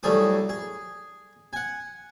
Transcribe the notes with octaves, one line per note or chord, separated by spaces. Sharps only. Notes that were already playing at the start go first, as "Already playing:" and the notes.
C2 F#3 G3 A3 G#4 D#6
G#4
F#5 G#5